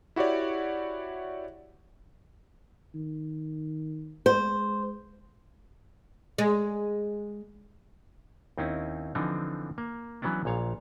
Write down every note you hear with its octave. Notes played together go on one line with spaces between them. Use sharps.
E4 F#4 G4 C#5 D5
D#3
G#3 C5
G#3
D#2 C4 C#4 D#4 E4
D3 E3 F3 C4 D4 D#4
A#3
E3 F#3 B3 C#4 D4
A#1 A#2 C#5 F5